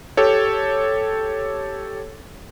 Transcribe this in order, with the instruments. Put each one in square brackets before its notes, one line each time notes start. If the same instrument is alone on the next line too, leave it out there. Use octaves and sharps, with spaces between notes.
[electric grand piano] G4 A4 C#5